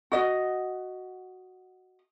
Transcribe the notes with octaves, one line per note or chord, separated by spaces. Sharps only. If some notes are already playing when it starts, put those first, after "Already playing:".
F#4 D#5